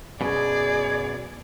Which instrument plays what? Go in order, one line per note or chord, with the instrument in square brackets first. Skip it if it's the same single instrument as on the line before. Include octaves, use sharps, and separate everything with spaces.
[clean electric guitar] F#2 B2 [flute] G#4 [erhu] D5